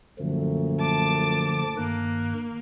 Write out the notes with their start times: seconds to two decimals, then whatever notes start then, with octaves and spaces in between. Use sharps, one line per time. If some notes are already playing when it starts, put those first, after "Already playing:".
0.19 F#2 A#2 D3 F3 A3
0.80 A5 D6
1.77 G2 D#3 A#3 F#6